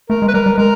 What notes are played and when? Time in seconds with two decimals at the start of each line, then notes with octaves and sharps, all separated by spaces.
0.10 A3 A#4
0.22 G#3
0.28 B4
0.34 G3 A#4
0.46 G3
0.58 G#3 A#4